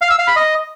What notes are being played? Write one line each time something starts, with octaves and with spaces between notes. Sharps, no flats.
F5
E6
F5
B5
D#5